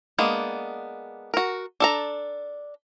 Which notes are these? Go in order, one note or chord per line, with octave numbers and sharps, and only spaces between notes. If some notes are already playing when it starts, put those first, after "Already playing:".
G#3 A#3 B3 D4
F#4 A#4
D4 A4 A#5